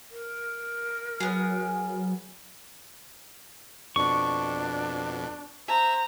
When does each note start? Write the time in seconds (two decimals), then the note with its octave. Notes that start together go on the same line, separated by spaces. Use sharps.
0.11 A#4
1.20 F#3 B3 G#4
3.96 F2 B2 D4 C#6
5.68 C5 E5 A#5